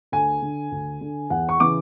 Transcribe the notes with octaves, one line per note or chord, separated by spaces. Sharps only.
D2 G#5
D3
D2
D3
E2 F#5
C#6
C#3 E3 D6